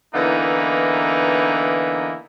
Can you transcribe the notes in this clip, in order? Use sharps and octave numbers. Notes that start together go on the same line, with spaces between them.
D3 E3 A#3 B3 D#4 E4